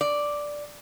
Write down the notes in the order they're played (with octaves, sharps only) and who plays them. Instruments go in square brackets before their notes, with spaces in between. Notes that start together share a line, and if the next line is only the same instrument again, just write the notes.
[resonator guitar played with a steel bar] D5